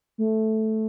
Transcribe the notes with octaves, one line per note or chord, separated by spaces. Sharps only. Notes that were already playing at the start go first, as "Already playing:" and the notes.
A3